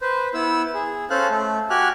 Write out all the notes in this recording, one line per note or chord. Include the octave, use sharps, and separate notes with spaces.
B4 C5
B3 E4 E6
G#4
C#4 A4 C5 F5 F#6
A3
F#4 G4 G#5 F6 F#6